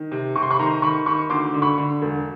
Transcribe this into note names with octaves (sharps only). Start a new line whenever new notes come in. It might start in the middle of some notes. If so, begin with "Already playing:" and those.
Already playing: D#3
C3
C3 C#6
C6
B5 C#6
D#3 A#5 C6
D#3 B5 C#6
D#3 B5 C#6
D2 C6 D6
D3
B5 C#6
D3
E1